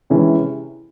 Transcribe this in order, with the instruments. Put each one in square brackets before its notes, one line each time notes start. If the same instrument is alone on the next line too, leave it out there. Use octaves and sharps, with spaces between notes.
[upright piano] C3 E3 G#3 C#4